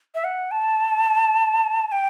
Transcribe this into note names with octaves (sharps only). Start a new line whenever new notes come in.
E5
F#5
A5
A5
G5